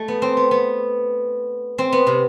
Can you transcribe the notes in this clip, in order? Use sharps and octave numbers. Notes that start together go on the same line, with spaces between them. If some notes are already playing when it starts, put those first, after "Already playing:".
Already playing: A3
B3
C4
B3
B3
C4
B3
C3